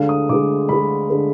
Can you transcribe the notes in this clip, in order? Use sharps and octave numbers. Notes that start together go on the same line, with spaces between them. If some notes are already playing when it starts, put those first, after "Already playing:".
Already playing: D2 D3 G#3 F5
D#6
D2 D3 G#3 D6
D2 D3 G#3 B5
D3 G#3